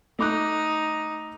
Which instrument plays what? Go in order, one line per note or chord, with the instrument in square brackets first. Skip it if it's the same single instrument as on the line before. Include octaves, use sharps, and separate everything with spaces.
[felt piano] A3 D6 F#6 [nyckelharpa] D#4